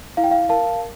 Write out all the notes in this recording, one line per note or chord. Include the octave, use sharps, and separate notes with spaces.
E4 F5
G5
F5
A#4 F5 A5